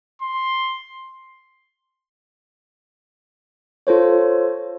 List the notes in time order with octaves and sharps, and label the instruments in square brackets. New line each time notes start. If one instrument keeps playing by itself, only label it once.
[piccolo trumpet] C6
[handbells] F4 A4 C5 C#5